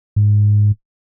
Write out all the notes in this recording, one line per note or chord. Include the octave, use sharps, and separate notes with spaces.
G#2